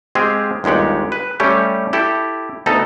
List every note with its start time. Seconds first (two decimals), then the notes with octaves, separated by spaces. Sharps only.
0.15 G#3 C4 G4 G#4 F5
0.64 G1 D#2 G#3 G4 F#5
1.12 B4
1.40 G3 A3 C#4 G4
1.93 E4 G4 A4
2.66 D2 B3 D#4 A4 A5